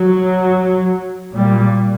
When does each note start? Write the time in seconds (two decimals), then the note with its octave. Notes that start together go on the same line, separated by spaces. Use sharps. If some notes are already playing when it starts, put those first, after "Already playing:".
Already playing: F#3
1.33 A#2 G3